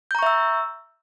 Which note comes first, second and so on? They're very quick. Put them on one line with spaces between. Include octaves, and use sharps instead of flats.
G6 A#5 C#6 E5 E6